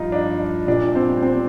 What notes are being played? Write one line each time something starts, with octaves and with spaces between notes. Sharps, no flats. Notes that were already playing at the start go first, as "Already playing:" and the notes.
Already playing: G2 F3 D#4 F4
D4
A#2 G3 D4
C4
C4